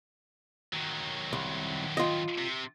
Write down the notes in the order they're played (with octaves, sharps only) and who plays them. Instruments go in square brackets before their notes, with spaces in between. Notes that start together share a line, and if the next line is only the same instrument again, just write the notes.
[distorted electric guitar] D#3 F#3
[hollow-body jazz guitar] C2
F4 D#5
[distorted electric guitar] C3